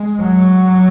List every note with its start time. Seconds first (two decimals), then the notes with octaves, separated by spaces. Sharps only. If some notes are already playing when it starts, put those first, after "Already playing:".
Already playing: G#3
0.20 F#3